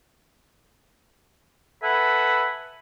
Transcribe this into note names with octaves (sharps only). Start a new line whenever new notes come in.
A4 B4 E5 F#5 G#5 B5